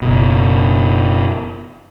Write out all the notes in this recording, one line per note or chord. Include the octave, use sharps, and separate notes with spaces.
F#1 B2